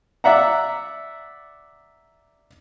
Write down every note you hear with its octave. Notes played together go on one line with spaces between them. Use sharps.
D5 E5 F#5 A#5